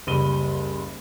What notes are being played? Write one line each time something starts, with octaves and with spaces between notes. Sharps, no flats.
F#1 C#2 G3 B5 D#7 G7